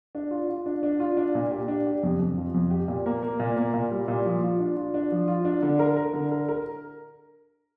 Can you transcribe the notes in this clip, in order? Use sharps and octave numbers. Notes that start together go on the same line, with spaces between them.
D4
F4
F4
D4
D4
F4
D4
A#2
G4
D4
G4
F2
F2
F3
F2
G4
A#2
A#3
A#3
A#2
A#3
A#2
G3
A#2
F3
F4
D4
F4
D4
F3
F4
D4
D3
A#4
A#4
D3
A#4
A#4